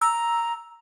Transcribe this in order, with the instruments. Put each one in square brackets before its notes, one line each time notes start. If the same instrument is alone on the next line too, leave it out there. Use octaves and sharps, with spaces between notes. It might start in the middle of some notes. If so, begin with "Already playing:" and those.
[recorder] A#5 [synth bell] E6